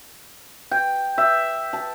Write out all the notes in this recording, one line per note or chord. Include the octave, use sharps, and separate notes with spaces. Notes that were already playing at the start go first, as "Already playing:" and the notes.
G5
E5
A5